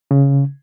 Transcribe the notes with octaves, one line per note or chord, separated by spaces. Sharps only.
C#3